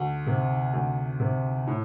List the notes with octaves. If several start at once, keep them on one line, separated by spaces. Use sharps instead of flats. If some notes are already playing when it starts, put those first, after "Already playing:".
Already playing: D2
C3
D2
C3
A2